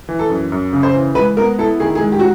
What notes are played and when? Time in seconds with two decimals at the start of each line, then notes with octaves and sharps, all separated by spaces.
0.09 E3
0.19 A4
0.30 F#2
0.52 F#2
0.73 C#3
0.83 C5
0.94 E3
1.15 G#3 B4
1.37 B3 A#4
1.59 E4 A4
1.80 D#3 G#4
1.95 G#4
2.01 G#3
2.12 G4
2.19 F#4